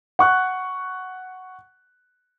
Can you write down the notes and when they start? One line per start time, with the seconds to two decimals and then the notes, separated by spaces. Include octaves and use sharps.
0.19 F#5 C#6 F#6